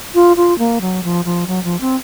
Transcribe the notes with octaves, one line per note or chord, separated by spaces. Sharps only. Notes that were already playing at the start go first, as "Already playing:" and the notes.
F4
F4
A#3
F#3
F3
F3
F#3
F3
C4